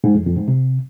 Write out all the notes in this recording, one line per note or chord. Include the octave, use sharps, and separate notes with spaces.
G#2
F2
F2
G#2
C3